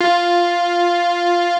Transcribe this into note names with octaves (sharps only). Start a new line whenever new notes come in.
F4